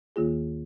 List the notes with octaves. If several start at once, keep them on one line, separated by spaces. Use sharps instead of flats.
D#2 D#3 A#3 F4 G#4